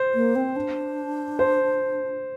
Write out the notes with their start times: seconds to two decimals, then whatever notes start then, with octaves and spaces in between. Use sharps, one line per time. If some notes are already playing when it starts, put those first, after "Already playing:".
Already playing: C5
0.14 A#3
0.35 C4
0.56 D4
1.39 C5